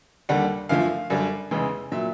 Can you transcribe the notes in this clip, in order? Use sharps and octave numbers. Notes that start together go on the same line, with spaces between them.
D#2 D3 G3 F#5
F#2 D3 F3 A3 F5
F#2 D3 G3
F1 E2 C#3 E3 G#3
A#2 F#3 E5